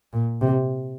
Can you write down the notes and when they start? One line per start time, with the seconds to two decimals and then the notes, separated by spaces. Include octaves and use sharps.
0.13 A#2
0.41 C3